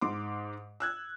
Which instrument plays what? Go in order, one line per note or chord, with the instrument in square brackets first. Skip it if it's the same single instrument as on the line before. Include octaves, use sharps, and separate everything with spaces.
[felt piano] G#2 C6 D6
E6 F#6 G#6